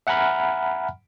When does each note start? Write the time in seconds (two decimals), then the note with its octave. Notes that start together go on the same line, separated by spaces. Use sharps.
0.07 E5 F#5 G#5 A#5 B5 F6